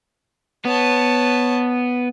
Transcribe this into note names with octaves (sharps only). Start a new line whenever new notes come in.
B3 C#5 A5